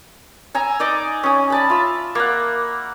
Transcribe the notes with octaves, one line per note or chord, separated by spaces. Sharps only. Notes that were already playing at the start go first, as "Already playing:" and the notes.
G#5 A#5 E6
D#4 D5 D#5 D6
C#4 D#6
D5 A5 B5
F4 E5
A#3 F#5